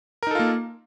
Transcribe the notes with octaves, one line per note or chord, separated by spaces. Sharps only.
A#3 D#4 F4 A4 A#4